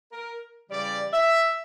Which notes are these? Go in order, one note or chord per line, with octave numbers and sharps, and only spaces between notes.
A#4
C#3 E3 G3 D5
E5